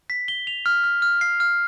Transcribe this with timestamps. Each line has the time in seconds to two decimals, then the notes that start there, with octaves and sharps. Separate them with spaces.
0.10 B6
0.28 G7
0.47 F7
0.66 F6
0.84 F6
1.02 F6
1.21 C7
1.40 F6